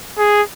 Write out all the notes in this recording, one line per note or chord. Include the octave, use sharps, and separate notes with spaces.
G#4